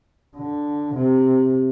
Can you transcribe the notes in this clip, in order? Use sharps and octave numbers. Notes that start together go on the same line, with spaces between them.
D3
C3